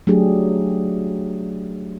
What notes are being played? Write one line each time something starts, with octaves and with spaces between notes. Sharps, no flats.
F#3 A3 D4 G4 G#4